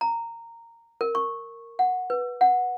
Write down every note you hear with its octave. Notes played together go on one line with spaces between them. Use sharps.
A#5
A#4
C#6
F#5
B4
F#5